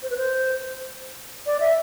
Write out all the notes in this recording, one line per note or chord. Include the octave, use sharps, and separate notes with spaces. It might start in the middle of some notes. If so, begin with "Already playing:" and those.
C5
B4
C5
D5
E5